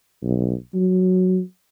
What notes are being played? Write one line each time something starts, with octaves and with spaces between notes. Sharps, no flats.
B1
F#3